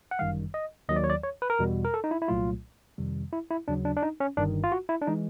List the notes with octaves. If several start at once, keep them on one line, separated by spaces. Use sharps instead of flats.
F#5
G1 F#2 D#3 G3 F5
D#5
D#2 D#3 F#3 D#5
D5
C#5
D5
C#5
B4
A#4
E2 B2 G3
A#4
A4
D#4
E4
E4
C2 A#2 F#3 A3 F4
F2 C3 D#3 G3
E4
E4
D#2 C#3 F#3 D4
D4
D4
D#4
C#4
G1 G2 D#3 D4
F4
F#4
E4
D4
E3 G#3 D#4